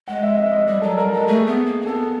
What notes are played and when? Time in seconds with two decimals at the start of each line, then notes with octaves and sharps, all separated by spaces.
0.08 G#3 F#5
0.23 E5
0.38 E5
0.52 D#5
0.66 G3 D5
0.82 F#3 A4
0.97 G3 A#4
1.12 G#3 A4
1.27 A3 G#4
1.46 B3
1.66 A#3
1.81 C4
1.86 B3 A4